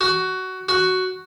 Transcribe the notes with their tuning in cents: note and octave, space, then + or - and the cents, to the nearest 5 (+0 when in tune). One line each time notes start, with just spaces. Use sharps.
F#4 +15
F#4 +5